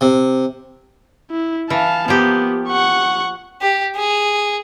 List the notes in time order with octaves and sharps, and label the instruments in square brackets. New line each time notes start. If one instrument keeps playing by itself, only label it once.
[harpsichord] C3
[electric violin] E4
[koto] E3 [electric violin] F5 A5
[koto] F3 A#3 G4 [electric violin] B3
[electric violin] F#5 C#6
[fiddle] G4
G#4